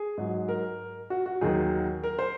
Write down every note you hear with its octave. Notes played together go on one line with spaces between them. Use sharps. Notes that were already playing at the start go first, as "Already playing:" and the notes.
Already playing: G#4
G#2 F#3
A#4
F#4
F#4
D#2 D#3 F#3 G#4
A#4
C5